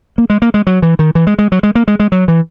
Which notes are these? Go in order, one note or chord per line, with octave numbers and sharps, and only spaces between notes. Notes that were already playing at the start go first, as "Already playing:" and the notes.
A#3
G#3
A#3
G#3
F#3
E3
D#3
E3
G#3
G#3
F#3
G#3
A#3
G#3
G#3
F#3
E3